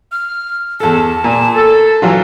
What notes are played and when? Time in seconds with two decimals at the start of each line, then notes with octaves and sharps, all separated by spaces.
0.12 F6
0.80 E2 A4 A5
1.24 A#2
1.56 A4
2.02 E3 F#3 F4